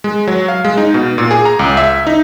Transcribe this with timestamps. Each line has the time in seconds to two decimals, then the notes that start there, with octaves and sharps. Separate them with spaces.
0.04 G#3
0.27 F#3
0.48 F5
0.64 G#3
0.77 D#4
0.94 B2
1.18 A#2
1.31 G#4
1.45 A#5
1.59 C#2
1.77 E5
2.07 D#4